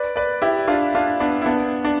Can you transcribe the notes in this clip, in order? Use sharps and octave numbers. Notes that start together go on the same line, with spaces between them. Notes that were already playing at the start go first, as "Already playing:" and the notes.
Already playing: B4 D5
B4 D5
E4 G4
D4 F4
D4 F4
B3 D4
E4
B3 D4
D4